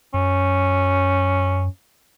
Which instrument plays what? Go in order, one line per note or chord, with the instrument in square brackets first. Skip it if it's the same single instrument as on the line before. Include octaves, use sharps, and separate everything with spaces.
[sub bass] F#2 [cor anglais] C#4